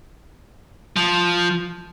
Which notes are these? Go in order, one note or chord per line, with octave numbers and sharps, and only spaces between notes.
F3